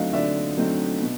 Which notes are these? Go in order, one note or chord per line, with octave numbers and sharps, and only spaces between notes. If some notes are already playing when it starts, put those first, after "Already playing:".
Already playing: D3 F#3 A3 C4 D#4 D#5 F5
D3 D5 E5
F#3 A3 C4 D#4
B2